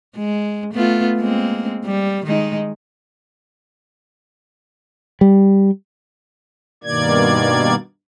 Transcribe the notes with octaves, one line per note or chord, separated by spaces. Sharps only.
G#3
A3 B3 F4
G#3 A#3 C4
G3
D#3 G#3 D#4
G3
G2 B2 D#3 A#3 D5 G#6